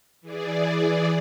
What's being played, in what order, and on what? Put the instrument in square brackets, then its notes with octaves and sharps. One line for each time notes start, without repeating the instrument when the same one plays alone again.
[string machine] E3 G#4 D5